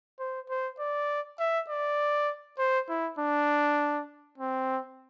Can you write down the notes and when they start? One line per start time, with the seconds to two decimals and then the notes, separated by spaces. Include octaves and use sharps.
0.19 C5
0.50 C5
0.79 D5
1.39 E5
1.69 D5
2.58 C5
2.89 E4
3.19 D4
4.38 C4